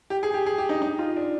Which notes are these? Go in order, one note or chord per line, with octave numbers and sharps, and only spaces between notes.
G4
G#4
G4
G#4
G4
D#4
D#4
F4
D4